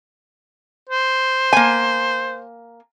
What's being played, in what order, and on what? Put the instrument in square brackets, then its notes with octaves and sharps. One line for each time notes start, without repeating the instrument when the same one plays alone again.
[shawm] C5
[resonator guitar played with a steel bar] A#3 G#5